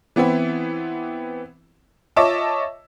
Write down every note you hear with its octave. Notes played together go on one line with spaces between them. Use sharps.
E3 B3 C4 E4
F4 C#5 D#5 E5 A5 D6